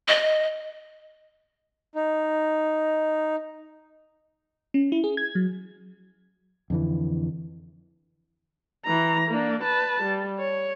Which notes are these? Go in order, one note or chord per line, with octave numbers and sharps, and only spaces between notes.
D#5
D#4
C#4
E4
G#4
G#6
F#3
F2 D3 E3
E3 A#5
A#3 D4
B4 A5
G3
C#5